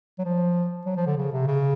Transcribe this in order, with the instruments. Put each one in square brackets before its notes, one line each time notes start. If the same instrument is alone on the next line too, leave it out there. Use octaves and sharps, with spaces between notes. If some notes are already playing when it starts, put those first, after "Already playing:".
[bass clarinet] F#3
F3
F#3
F3
D3
C#3
C3
C#3